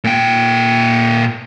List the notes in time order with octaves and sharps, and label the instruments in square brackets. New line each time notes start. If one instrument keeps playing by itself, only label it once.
[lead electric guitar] A#2 G5